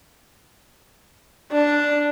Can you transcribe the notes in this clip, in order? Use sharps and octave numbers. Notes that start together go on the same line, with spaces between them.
D4